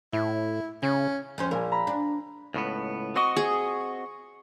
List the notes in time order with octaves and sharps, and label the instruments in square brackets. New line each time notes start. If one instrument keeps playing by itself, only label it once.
[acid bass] A2 [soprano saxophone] E4
[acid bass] C#3 [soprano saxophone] C#4
[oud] F2 C#4 C5
[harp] A#1 G#5 [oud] A#4
[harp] A#5 B5
[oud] D4
[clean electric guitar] C#2 A2 B3
[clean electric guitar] C4 F#4 D#5 [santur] C#6 D#6
[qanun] G#4